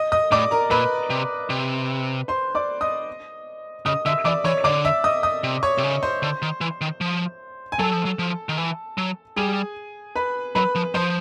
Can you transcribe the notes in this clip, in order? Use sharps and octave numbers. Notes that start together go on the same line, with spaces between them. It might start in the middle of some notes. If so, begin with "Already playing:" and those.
Already playing: D#5 D#6
D#5 D#6
A2 D5 D6
A#4 A#5
A#2 B4 B5
C3
C3
C5 C6
D5 D6
D#5 D#6
C#3 D#5 D#6
D3 E5 E6
E3 D5 D6
E3 C#5 C#6
D3 D5 D6
E5 E6
D#5 D#6
D#5 D#6
C3
C#5 C#6
C3
C#3
C5 C6
D3
D#3
E3
D#3
F3
G#5
F#3 A4 A5
F3
F#3
F3
D#3
E3
F#3
G3 G#4 G#5
B4 B5
F#3 B4 B5
F3
F3 C5 C6